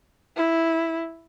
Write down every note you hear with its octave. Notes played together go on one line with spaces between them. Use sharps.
E4